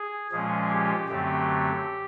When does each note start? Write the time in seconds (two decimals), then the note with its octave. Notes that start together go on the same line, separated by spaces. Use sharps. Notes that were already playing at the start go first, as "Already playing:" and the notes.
Already playing: G#4
0.31 A#2 F3 G#3 C#4 G#4
0.69 G4
1.08 F#2 D3 F#3 A3 C4 G4